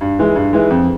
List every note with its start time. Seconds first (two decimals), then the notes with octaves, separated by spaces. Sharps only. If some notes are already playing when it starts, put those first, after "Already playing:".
0.01 G2
0.19 E3 G#3
0.36 G2
0.53 E3 G#3
0.70 F2